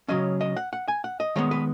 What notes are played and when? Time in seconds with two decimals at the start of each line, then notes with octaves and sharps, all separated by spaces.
0.08 C#3 F#3 C#4 D#5
0.41 D#5
0.57 F#5
0.73 F#5
0.88 G#5
1.04 F#5
1.20 D#5
1.36 D#3 G#3 B3 C#5
1.51 B4